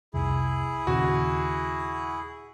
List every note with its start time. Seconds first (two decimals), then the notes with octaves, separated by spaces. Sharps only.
0.14 F1 C2 E4 G#4
0.87 D#2 A#2 C#3 F#4